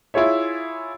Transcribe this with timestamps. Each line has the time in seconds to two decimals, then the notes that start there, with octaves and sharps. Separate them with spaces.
0.14 E4 F4 G#4 C#5 E5